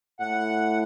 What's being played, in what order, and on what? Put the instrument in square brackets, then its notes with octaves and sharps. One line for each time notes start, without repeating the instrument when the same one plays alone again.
[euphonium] A2 [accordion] F#5